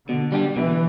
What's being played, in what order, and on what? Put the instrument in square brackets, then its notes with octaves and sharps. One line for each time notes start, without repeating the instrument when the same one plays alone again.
[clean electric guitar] B2 [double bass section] D3
[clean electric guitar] G3 D4 G4
[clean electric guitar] B2 [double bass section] E3